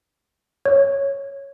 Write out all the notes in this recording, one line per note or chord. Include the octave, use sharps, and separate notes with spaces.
C#5